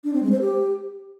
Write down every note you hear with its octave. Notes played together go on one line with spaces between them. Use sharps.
D4
C4
G#3
C5
G4